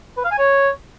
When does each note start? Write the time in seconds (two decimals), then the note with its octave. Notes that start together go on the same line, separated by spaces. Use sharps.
0.17 B4
0.24 F5
0.31 G#5
0.38 C#5